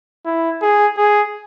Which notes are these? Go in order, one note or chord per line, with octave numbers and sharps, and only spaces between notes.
E4
G#4
G#4